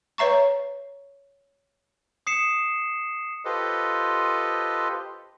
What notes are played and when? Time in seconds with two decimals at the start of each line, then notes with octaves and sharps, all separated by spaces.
0.18 B4 C#5 E5 A#5 C#6
2.27 D#6 C7 C#7 E7
3.45 F4 G4 A4 B4 C5 D#5